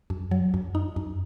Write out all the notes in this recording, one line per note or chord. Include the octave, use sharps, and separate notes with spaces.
F#2
F#3
F#2
D#4
F#2